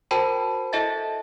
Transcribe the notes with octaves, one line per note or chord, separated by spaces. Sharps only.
F#4 A#4 C5 G5 A5 B5
E4 A4 D#5 E5 A5 A6